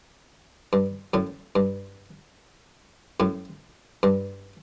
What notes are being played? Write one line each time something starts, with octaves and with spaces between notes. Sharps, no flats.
G2
F#2 A2
G2
F#2 A2
G2